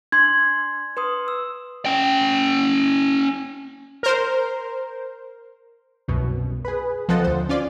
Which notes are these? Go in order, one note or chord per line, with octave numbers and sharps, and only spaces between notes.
D4 C6 G#6
B4 C6 D#6
E6
C#4 G5
A#4 C5
C2 F#2 B2
G#4 B4
C#2 F3 C4 A4 D#5 F#5
D2 C5
C#4 F4 D5